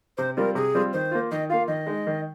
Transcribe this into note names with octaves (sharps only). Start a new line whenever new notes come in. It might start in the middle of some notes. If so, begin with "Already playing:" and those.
C3 C5
G3 C4 F4 A#4
C3 G#4
G3 C4 F4
D#3 C5
A#3 F4
D#3 D#5
A#3 F4 F5
D#3 D#5
G#3 D#4
D#3